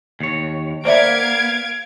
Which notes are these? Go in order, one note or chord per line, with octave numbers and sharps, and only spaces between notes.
D#2 C#5
A#3 B3 C5 D5 E5 F5 G#6 D7